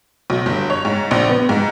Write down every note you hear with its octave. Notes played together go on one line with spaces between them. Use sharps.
B1
G1
C#5
G#2
A#1
B3
G#2